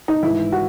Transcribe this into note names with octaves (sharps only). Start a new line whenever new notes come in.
D#4
G#1 G#2 E3 E4
F#4